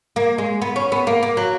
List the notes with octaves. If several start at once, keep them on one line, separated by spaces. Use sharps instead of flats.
A#3
G#3
B3
C#4
B3
A#3
A#3
F#3